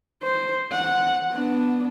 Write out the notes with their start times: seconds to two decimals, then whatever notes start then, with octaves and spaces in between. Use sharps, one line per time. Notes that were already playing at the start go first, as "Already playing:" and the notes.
0.23 C5
0.72 F#5
1.33 B3 D4